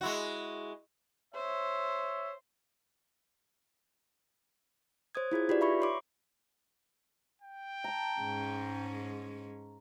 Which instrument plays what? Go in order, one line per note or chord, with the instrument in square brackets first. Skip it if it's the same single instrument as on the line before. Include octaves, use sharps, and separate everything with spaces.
[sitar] G#3 E4 F#4
[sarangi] C5 [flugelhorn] C#5 [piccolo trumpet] E5
[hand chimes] C5 C#5 D#6 G#6
E4 F4 G#4 G#6
D#4 F4 G4 B4 D5
E5 B5 C#6
C#5 C6 D6
[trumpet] G5
[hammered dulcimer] A5 A#5
[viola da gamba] G#2 G#3 C#4